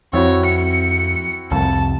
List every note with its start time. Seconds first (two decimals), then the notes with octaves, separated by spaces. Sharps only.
0.13 F2 C4 E4 F#4 C#5
0.45 C#7
1.51 C2 F2 A5